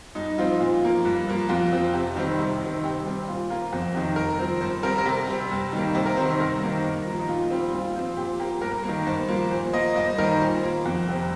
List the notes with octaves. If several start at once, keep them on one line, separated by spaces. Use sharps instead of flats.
G2 D#4
F3 C4 F4
A#2 F4
F3 A#3
G2
F3 A#3
F2 F4
F3 C4
C3 G4
D#3 G3 C4
C3
D#3 C4
G2 G4
G3 C4
A#2 F4
A#3 F4
F2 C5
C3 D#3
G2 A#4
F3 C4 C5
G2 C5
G3 C4 A#4
A#4
C3 G4
G3 C4
G2
D#3 G3 A#3
C3 C5
A#4
D#3 G3 C4 C5
C5
G2 A#4
D#3 A#3
G2
F3 A#3
D#4
A#2 F4
G3 C4
A#2 F4
F3 C4 C5
A#2 G4
A#3 G4
G2 A#4
D#3 A#3
G2 C5
F3 A#3
A#2 C5
A#3 D#5
G2 D#5
C5
D#3 G3 A#3 A#4
C5
A#2 C5
A#3
F2
C3 G3 C4